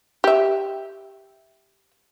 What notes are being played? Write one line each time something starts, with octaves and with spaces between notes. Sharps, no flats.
G4 E5